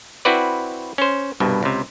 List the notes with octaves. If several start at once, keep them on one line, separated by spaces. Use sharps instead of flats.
C4 E4 F#4 B4 D5
C#4 C5
C2 G2 B2
C#2 C3